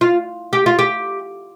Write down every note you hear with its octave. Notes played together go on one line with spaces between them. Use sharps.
F4
G4
F4
G4